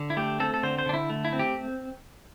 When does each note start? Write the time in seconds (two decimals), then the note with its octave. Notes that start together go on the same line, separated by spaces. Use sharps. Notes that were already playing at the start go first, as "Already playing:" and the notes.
Already playing: D3
0.10 E4
0.17 A3 G4
0.40 C4 A4
0.54 A4
0.63 D3 C5
0.78 C5
0.86 D3 D4
0.94 E4
1.10 A3
1.25 E4
1.33 C4
1.39 G4